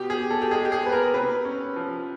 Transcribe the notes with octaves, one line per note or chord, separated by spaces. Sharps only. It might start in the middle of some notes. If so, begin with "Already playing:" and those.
Already playing: B2 G4
G#4
B2
A4
G4
G#3 G#4
G4
G#4
B3 B4
A#4
C3 B4
C#4
F3